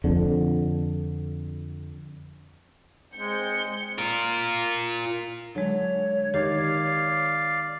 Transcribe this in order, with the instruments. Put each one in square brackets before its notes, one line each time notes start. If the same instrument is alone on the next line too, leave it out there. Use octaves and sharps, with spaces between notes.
[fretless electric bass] F2 D3
[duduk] G#3 [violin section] C4 G6 C#7
[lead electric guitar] F4 A#4
[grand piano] D3 [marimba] F#3 G#3 [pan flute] C#5
[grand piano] D#3 [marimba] G4 [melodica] D5 F5